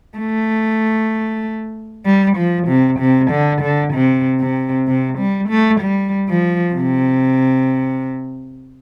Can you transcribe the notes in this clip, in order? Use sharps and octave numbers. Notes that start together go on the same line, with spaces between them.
A3
G3
F3
C3
C3
D3
D3
C3
C3
C3
G3
A3
G3
F3
C3